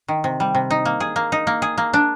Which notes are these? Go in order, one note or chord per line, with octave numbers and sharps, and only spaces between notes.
D#3
C3
G3
C3
D#4
A#3
G#4
A#3
D#4
A#3
G#4
A#3
D4